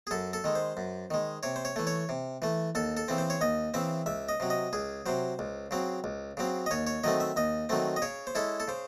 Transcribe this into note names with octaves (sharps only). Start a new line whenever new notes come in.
G#4
F#2 A4
A4
D#3 G#3
C5
F#2
D#3 G#3
C3 C#5
C5
C#5
E3 A3
C#5
C3
E3 A3
D#2 A4
A4
C#3 E3 C4
C5
C#5
D#2 D#5
C#3 E3 C4 E5
C#2 E5
D#5
C3 F#3
D#5
C#2 G#4
C3 F#3 C5
C#2
C#3 F#3 C4
C#2
C#3 F#3 C4
D#5
D#2 C#5
C#5
D#3 F#3 A3 C4 D#5
E5
D#2 D#5
D#3 F#3 A3 C4
D#5
C#3 C#5
C5
G#3 C#4 E4 A4
A4
C#3 C5